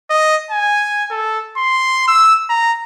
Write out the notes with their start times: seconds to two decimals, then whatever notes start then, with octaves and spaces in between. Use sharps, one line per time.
0.10 D#5
0.51 G#5
1.11 A4
1.57 C6
2.08 E6
2.50 A#5